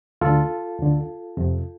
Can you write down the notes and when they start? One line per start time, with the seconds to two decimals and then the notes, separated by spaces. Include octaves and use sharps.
0.21 D2 D3 F4 A4
0.79 D2 D3
1.37 F2 C3